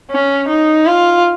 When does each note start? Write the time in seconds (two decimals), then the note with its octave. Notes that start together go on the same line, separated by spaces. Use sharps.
0.11 C#4
0.49 D#4
0.86 F4